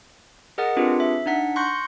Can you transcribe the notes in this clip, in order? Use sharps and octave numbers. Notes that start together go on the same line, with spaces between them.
G#4 A#4 D#5 F#5 D#6 A6
C4 D4 F4 G4 G#4 B4
E5
D4 D#4 F#5 B6
C6 C#6 F#6 G6 A#6 C#7